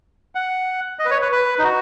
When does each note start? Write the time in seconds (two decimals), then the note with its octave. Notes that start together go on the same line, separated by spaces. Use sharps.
0.35 F#5
0.99 D#5
1.05 B4
1.10 C#5
1.22 B4
1.32 B4
1.59 D#4
1.63 F#4